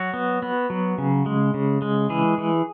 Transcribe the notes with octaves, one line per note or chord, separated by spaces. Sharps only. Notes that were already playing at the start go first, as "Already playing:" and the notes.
Already playing: F#3 F#4
B3
B3
F#3
C#3
G#3
C#3
G#3
E3 G#4
E3